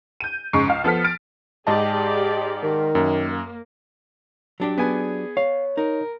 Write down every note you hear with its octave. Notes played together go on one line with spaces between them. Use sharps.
G6 D#7
G#2 C#3 C#6 C7
C#2 F5
F3 B3 A4 F6 B6
F6 A6 D7
G#2 G4 G#4 D5 D#5 A5
D#3
F#2 A#3
F#3 D4 G4
B3 G#4 G#5
C#5 F5
D#4 A#4